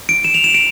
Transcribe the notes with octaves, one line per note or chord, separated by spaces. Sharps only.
D7
E7
F7
E7
D7